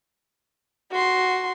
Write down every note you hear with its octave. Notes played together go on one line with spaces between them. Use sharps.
F#4 C6